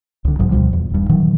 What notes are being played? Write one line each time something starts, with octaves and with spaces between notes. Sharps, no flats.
C2 D3
B1 G#2 F#3
D2 B2 F3 G3
E2
D#1 G2
A#2 D#3 E3 F#3